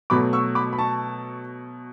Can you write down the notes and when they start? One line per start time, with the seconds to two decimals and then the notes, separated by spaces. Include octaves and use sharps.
0.10 B2 F#3 A3 B5 D6
0.33 C#6 E6
0.55 B5 D6
0.73 B5
0.79 A5 C#6